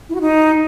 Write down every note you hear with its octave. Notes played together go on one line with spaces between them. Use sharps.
E4
F#4
D#4